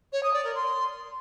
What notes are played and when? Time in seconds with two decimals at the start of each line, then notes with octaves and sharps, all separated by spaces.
0.12 C#5
0.23 D#6
0.33 D5
0.44 A#4
0.55 C6